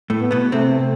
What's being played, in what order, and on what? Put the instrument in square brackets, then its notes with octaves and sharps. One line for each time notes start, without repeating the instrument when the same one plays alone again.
[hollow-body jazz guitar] A2 A3
[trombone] B3
[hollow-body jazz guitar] B2 B3
[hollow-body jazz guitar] C3 C4 [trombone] A3